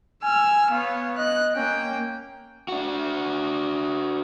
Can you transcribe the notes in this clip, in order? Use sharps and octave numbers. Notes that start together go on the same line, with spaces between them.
G#5 E6 F6
B3 C#5 F5
D#5 F#6
A#3 C#4 G5
D4 F#4